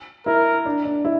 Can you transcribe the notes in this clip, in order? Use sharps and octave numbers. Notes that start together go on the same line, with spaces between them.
E4 A#4
D4
D4
E4